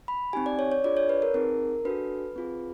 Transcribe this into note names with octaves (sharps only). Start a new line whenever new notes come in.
B5
C4 D#4 G4 G#5
D5
C#5
C#5
D4 F4 G#4 D5
C#5
B4
A#4
C4 D#4 G#4 A#4
D4 F#4 A4 B4
C4 F4 G#4